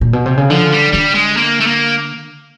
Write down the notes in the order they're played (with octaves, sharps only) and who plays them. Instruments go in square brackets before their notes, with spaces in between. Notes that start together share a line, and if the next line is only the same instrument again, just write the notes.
[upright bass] A#2
B2
C3
C#3
[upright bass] D3 [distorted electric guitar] F3
[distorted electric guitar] G3
[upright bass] D3 [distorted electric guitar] G3
[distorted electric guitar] G#3
A#3
A3
A#3